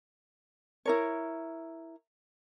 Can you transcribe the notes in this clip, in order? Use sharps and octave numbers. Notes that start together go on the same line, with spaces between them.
E4 A#4 C#5